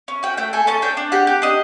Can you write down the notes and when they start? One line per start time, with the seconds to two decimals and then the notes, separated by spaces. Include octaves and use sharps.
0.08 C#4
0.23 F#4 G5
0.37 A3 G5
0.53 A4 G#5
0.67 C#4 A5
0.82 D4 G5
0.97 D4
1.12 G4 F#5
1.27 G4
1.42 D4 D#5